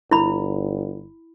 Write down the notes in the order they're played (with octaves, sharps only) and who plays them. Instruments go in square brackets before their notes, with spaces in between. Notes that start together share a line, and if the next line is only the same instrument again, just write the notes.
[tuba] G1 [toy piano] E4 B5